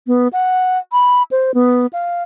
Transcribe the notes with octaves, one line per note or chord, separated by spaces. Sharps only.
B3
F#5
B5
C5
B3
F5